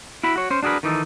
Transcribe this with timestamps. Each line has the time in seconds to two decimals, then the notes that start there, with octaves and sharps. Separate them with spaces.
0.23 E4 F#4 B5
0.36 F#4 C#5
0.50 C#4 C5
0.63 D4 F#4 G#4 A#4 B4
0.83 D#3 E3 D#4 A4